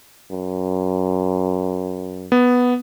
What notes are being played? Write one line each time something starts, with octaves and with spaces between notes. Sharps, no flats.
F#2
B3